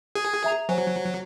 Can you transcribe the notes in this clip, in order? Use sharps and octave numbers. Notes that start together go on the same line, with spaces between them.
G#4
E5 A#5 F7
F#3 C5 G#5